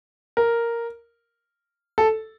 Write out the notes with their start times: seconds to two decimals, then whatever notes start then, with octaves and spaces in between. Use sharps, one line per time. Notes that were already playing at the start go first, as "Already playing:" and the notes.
0.37 A#4
1.98 A4